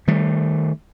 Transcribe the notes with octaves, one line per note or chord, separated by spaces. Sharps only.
D#3 G3 A3